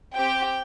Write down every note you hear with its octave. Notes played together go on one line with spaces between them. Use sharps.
C4 G4 G5